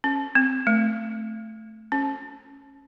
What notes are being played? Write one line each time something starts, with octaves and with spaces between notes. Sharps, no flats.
C#4
C4
A3
C#4